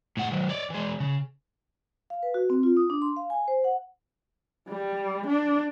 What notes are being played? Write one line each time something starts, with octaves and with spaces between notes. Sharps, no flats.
A2 F#5
D#3 F#3
C#5 D5
E3 G#3
C#3
F5
B4
F#4
C4
F4
D#6
D4
C6
F5
G#5
C5
F#5
G3
D4